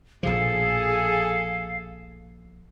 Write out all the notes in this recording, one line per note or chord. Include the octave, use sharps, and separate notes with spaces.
A#1 B2 F3 G#4 A4 F5